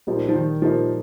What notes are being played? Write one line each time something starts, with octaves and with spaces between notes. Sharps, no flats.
A#2 F3 G3 A#3 D#4
F3
D#3
A#2 F3 G3 A#3 D#4